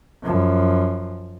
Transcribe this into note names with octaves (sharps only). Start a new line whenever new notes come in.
F#2 F3